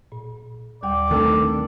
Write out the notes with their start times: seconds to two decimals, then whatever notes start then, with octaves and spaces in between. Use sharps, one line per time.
0.12 A#2
0.83 D#2 G3 D5 G5
1.11 D#3 A3 C4 D4 A4 A#4